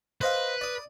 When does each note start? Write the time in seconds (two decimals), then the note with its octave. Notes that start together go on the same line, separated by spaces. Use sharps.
0.21 B4 C5 D#5 F5
0.61 D5 D#6